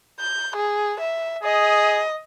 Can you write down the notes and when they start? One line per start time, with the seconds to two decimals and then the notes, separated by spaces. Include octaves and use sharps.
0.20 G6
0.56 G#4
1.00 E5
1.43 G#4 D#5